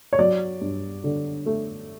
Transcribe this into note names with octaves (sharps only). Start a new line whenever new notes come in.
C#5
F#3 D5
G2
D3
A3